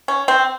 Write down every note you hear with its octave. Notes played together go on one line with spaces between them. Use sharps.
C#4
C4